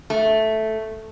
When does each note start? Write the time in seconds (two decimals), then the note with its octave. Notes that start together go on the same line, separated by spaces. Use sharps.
0.10 A3